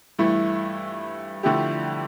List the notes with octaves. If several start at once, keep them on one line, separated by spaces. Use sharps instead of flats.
G2 E3 A3 E4
F2 D3 A3 E4 G4